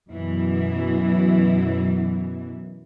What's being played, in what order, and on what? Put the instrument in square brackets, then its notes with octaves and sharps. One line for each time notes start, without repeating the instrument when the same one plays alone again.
[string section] F#2 B2 E3